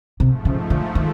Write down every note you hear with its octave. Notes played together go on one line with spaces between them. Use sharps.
G#2 C3 F3 A3
C#3
D3
D#3